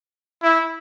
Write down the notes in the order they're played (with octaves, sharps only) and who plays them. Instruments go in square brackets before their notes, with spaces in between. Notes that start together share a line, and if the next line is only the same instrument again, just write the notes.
[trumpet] E4